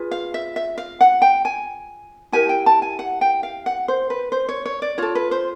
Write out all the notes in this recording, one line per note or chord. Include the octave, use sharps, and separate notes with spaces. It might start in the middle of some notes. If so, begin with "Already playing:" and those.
Already playing: F4 G#4 B4
F5
E5
E5
F5
F#5
G5
G#5
E4 G4 A#4 G#5
G5
A5
G#5
F#5
G5
F5
F#5
C5
B4
C5
C#5
C#5
D5
F4 A4 C#5
B4
C5